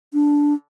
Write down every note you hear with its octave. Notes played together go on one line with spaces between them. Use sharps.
D4